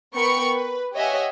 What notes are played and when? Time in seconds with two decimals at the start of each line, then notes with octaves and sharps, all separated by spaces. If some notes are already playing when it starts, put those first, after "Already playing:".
0.16 B3 A#4 G5 B5 C#6 C#7
0.54 B4
0.94 G4 C#5 D#5 E5 F#5 G#5